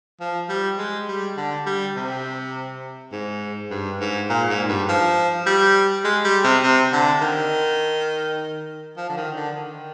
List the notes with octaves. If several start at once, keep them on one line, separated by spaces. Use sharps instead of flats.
F3
G3
G#3
G3
D3
G3
C3
G#2
G2
G#2
A#2
G#2
G2
F3
G3
G#3
G3
C3
C3
D3
D#3
F3
D3
D#3
D3
D#3